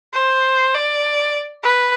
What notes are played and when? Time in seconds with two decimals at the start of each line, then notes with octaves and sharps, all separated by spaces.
0.13 C5
0.74 D5
1.63 B4